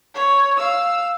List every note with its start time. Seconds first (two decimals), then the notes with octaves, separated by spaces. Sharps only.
0.15 C#5
0.57 F5 E6